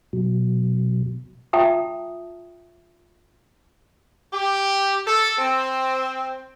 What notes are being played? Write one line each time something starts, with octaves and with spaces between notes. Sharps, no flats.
B2 F#3
F4 E5 G5 A5 A#5 D#6
G4
A4
C4